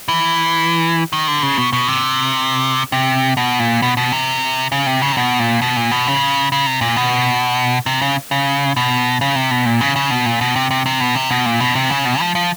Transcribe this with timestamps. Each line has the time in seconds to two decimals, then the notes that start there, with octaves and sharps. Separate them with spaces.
0.08 E3
1.13 D#3
1.28 D3
1.43 C#3
1.57 B2
1.73 B2
1.88 C3
2.92 C3
3.37 B2
3.60 A#2
3.82 B2
3.97 B2
4.12 C3
4.72 C#3
4.87 C3
5.02 C#3
5.12 C3
5.17 B2
5.39 A#2
5.62 B2
5.77 A#2
5.91 B2
6.07 C#3
6.52 C#3
6.66 C3
6.81 A#2
6.96 B2
7.86 C3
8.02 C#3
8.31 C#3
8.77 B2
9.21 C#3
9.36 C3
9.51 B2
9.66 A#2
9.81 C#3
9.96 C#3
10.11 B2
10.26 A#2
10.41 B2
10.56 C3
10.71 C3
10.86 C3
11.00 B2
11.15 C3
11.31 B2
11.46 A#2
11.60 B2
11.75 C3
11.90 C#3
12.05 B2
12.20 F3
12.35 F3